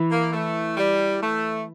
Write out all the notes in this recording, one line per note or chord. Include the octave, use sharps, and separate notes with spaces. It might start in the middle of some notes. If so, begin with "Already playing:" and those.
Already playing: E3
A#3
A3
G3
A3